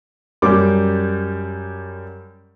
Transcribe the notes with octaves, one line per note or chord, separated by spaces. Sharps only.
F#2 G3 D6